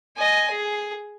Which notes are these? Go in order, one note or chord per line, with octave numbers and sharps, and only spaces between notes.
D#5 G#5
G#4